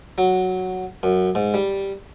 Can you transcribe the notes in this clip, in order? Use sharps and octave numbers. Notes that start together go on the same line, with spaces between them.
F#3
F#2
G#2
G3